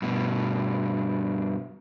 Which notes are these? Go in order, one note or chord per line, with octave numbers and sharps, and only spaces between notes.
G2 B2